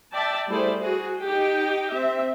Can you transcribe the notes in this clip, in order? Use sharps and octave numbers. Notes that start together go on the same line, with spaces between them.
D5 E5 G5 A5
G3 A3 E4 G#4 C5 D5
F#4 G#4
D#4 G4 G5
C4 E5